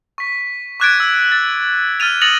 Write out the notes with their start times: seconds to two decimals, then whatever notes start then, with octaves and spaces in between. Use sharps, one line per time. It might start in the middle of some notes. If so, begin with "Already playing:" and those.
0.18 C#6 B6
0.80 C#6 D6 F#6 G#6 A6 D7
1.00 E6
1.32 A6
2.00 F6 A6 D#7 F7
2.22 D#6 A6 A#6 C#7 F7 F#7